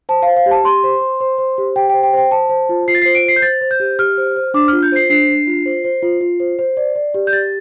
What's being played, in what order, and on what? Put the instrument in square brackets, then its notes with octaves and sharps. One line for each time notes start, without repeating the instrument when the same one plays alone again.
[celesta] C5 A5
C5 F5
F5
G4
A5
G4 C6
C5
C5
C5
C5
G4
G4 G5
C5 G5
G5
C5 G5
C5 A5
C5
F4
F4 C7
A6
C5 C7
D7
C5 C7
G6
C5 A6
C5
G6
G4
G4 F6
C5
C5
D4 D6
F4 F6
G6
C5 C7
D4 C7
D4
F4
C5
C5
F4
F4
C5
C5
D5
D5
G4
G6
G4 A6